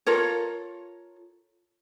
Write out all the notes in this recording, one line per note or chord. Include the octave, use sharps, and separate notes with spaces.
F4 A4 A#4 C#5